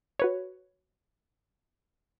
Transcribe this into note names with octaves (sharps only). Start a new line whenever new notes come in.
F#4 B4 C#5